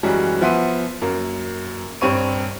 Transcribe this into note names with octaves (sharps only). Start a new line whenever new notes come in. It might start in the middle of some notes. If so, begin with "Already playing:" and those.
F#2 E3 G3 G#3 C#4 F#4
F3 B3 E5 F#5 C6 D#7
F#2 A#3
D#1 G2 C4 C#5 C#6 D#7